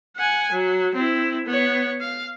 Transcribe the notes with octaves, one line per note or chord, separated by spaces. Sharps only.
F#5 G#5
F#3
C4 E4
B3 C#5
F5